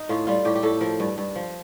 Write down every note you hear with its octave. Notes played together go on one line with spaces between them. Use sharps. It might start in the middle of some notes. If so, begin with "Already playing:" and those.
Already playing: D#4
A2 F4
G3 F4
A2 G4
G4
A2 A4
F3 A#4
G2
G2
F3